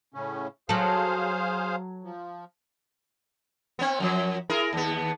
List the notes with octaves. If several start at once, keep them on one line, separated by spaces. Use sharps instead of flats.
A2 C#3 C#4
F#3 G#4 A4 C5 F5
F3
B3 C4
F#2 F3
E4 G#4 A#4
D#2 B3